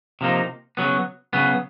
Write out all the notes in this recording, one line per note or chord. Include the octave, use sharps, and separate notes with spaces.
C3 F3 A#3 D#4
C#3 F#3 B3
C#3 F#3 B3